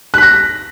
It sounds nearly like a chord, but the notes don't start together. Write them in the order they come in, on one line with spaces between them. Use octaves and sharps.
F#6 B6 A#6